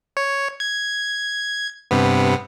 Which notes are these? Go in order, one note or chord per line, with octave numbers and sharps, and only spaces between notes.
C#5
G#6
G2 C3 B3